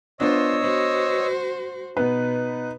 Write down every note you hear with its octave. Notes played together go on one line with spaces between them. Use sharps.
B3 D4 F4 C5 C#5 D#5 E6
F#4 C5
B2 B3 D#4 B4